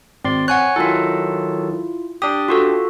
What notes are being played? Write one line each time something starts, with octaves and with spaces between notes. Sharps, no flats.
G#1 C4 D5 C6
C#5 F#5 G#5 F#6
D#3 F#3 E4 F4 A4
D4 G4 D#6
F4 F#4 A4